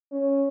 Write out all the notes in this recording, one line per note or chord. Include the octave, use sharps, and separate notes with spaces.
C#4